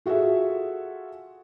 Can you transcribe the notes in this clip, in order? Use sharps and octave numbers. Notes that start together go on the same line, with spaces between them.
F4 F#4 G#4 A4 E5